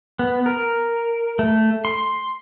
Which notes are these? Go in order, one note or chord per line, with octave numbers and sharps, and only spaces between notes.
B3
A#4
A3
C6